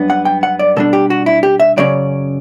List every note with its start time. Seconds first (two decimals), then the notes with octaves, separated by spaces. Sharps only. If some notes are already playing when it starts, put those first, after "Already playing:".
Already playing: F#2 G3 B3 D4
0.10 F#5
0.25 G5
0.43 F#5
0.59 D5
0.76 B2 G3 D4 A4
0.93 G4
1.10 F#4
1.26 E4
1.43 G4
1.60 E5
1.77 F#2 C#3 F#3 C#4 D5